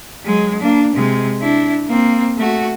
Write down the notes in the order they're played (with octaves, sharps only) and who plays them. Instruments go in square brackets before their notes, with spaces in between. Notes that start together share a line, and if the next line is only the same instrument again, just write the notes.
[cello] F#3 G#3
A#3 D4
C3 G#3
D4 E4
A#3 C4
A3 F#4